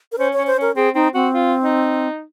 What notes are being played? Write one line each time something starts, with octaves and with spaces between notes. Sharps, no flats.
A#4
C#4 C5
C#4 C#5
C5
C#4
A#4
C4 G#4
C4 D#4
C4 F#4
F4
D#4